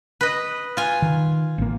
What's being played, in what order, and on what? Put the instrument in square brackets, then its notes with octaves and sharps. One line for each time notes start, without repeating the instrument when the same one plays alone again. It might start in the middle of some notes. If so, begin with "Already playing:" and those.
[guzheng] B4 D#5
F4 G#5
[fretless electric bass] D#3
A1 A#3